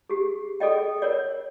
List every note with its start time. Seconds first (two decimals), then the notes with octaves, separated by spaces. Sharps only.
0.10 G4 G#4
0.60 G#4 A4 D5 D#5 G5
1.02 A#4 C#5 D5